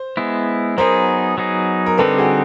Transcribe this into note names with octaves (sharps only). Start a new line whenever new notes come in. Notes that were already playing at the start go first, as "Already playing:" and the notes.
Already playing: C5
G#3 B3 E4
F#3 B3 D#4 G#4 A#4 C5
F#3 B3 D#4 G#4
A#4
D3 G3 C4 D#4 G4 A4 B4
F#4 G#4